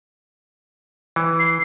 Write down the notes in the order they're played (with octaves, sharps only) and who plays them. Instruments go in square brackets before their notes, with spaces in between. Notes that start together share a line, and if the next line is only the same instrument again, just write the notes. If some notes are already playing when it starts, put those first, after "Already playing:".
[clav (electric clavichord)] E3
[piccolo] C7